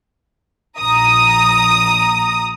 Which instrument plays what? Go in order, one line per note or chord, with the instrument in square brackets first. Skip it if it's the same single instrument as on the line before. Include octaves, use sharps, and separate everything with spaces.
[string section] A#1 A#5 D#6